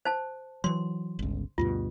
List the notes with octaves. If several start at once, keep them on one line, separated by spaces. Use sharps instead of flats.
C5 A5
E3 F#3 C6
G1 C#2
D2 G2 B2 F4